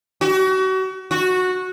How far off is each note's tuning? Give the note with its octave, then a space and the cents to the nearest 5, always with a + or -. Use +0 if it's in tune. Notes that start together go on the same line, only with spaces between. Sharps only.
F#4 +35
F#4 -10